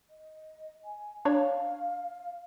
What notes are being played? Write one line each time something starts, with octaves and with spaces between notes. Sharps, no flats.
D#5
G#5
D4 C#5 F5